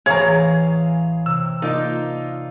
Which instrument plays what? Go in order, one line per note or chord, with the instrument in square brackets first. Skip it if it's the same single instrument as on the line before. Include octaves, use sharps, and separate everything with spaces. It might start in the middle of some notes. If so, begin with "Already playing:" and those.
[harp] A1 E3 D7 [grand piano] G#4 F5 [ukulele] C#5 A#5
[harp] C3 A#3 [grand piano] E6
[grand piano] A#3 D#4 F4 [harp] A#4 D5 A5